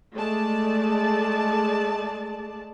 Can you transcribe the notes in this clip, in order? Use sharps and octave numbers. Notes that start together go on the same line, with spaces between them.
G#3 A3 G#4 D5 A5